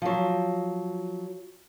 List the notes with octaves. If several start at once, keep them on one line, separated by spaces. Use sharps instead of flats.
F3 F#3